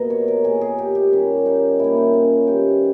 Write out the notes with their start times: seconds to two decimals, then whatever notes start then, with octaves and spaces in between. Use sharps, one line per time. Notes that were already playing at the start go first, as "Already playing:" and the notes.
Already playing: B2 A#3 D#5
0.10 C#5
0.28 A#4
0.44 A#2 A#3 G#4
0.61 G#4
0.78 G4
0.95 G4
1.12 A#2 G3 A#3 C#4
1.46 D#4
1.79 A#2 A#3 E4
1.97 D#4
2.14 C#4
2.47 D#3 G3 B3 G4